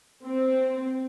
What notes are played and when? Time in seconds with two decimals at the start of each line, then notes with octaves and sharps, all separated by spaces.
0.23 C4